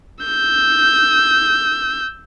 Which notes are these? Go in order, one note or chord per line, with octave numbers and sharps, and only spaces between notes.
E6 G6